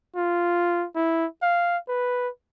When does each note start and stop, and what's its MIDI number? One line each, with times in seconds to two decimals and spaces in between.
0.16 0.86 65
0.95 1.26 64
1.42 1.78 77
1.89 2.29 71